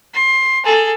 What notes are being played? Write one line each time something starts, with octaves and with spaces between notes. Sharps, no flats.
C6
G#4 A4